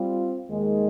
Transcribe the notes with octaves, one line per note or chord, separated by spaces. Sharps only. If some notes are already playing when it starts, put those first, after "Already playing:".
Already playing: G3 C4 F4
D#2 D#3 G#3